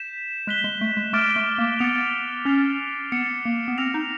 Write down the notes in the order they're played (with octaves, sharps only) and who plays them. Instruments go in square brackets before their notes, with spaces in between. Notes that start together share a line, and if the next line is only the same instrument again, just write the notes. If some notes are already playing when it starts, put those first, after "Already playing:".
Already playing: [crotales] G6 B6 E7
[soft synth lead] G#3 [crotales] F#6 B6 E7 G7
[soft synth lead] G#3
A3
G#3
[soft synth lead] A3 [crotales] D6 F6 A6 D7
[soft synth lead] A3
A#3
[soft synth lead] B3 [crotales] A6 C#7 F7
[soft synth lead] C#4 [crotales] A6 C7 F7
[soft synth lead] B3 [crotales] A6 C#7 E7
[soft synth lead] A#3
B3
[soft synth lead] C4 [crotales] F6 A#6 C#7 F7
[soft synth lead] D#4